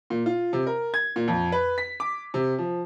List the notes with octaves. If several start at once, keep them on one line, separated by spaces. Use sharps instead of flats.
A#2
F4
C3
A#4
G#6
A#2
F2
B4
B6
D6
C3
F3